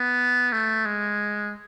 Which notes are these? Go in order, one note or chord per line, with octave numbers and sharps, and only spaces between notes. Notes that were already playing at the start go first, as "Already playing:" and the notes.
Already playing: B3
A3
G#3